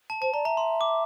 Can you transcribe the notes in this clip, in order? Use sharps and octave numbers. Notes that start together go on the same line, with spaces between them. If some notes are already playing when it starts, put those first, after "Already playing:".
A5
C5 A5
D5 A#5
E5 A#5
C6
D6